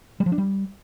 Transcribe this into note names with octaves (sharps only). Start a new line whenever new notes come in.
G3
F3
D4
G3